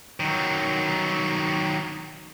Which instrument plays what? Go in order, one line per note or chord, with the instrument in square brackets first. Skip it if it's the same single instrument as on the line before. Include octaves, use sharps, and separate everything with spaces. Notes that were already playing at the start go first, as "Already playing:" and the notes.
[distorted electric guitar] D#3 F#3